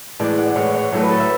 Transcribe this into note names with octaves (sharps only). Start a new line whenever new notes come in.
A2 E3 G#3 D5
F#5
D5
A2 E3 G#3 C#5
C#5
A2 F#3 A3 C#5
B4
A4
E5